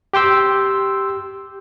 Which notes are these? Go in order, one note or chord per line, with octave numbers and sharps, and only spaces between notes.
G4 G5 C6 E6